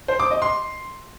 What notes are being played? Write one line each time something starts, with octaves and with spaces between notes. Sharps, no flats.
C5
D6
D#5
C6